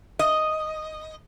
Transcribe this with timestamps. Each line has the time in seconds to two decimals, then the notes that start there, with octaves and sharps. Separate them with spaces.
0.19 D#5